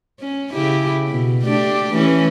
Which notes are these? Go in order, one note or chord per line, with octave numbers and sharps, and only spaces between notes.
C#4
C#3 E4 G4
B2
A3 D4 G4
E3 A3 C#4